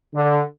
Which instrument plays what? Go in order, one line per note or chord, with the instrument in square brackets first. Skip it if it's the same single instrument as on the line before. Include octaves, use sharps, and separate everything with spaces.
[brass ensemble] D3